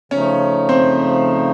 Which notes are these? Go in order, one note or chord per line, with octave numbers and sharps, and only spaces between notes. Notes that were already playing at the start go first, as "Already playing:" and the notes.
C#3 F3 A3 C#4 D#4 C#5
C4 C5